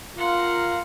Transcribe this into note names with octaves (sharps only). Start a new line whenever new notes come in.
F4 A#4 F5 F#5 C6